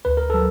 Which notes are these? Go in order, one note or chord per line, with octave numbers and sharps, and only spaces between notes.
D2 B4
A#4
F#3 A4